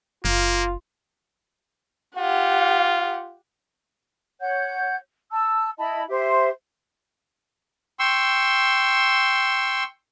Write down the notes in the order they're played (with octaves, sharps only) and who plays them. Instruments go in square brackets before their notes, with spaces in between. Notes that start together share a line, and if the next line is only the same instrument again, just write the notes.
[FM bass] F#1 [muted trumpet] A#3 [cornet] F4
[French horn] F4 [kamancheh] G4 F#5
[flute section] C#5 F#5 G6
A5 E6
E4 D#5 A5 B5
G4 C5 E5
[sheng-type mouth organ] G5 C6 C#6 E6